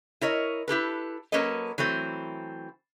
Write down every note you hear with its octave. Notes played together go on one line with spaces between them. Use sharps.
E4 A#4 C#5 D#5
E4 G4 A4 B4
F#3 A#3 C#4 A4 B4 D#5
E3 F#3 A3 C4